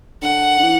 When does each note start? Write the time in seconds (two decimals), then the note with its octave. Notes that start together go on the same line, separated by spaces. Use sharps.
0.22 D3 F#5
0.59 D3
0.63 E3